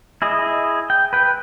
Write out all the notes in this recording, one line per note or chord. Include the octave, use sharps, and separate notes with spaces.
E4 G#4 D#5
G5
B4 G5